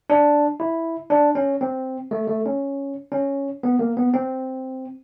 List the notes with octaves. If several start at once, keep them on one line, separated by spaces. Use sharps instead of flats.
D4
E4
D4
C#4
C4
A3
A3
C#4
C#4
B3
A#3
B3
C4